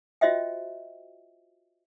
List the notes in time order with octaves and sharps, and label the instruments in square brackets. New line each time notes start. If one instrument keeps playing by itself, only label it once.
[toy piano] F4 F#4 C5 D#5 E5 G5